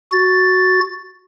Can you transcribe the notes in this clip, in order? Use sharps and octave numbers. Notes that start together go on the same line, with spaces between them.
F#4 A6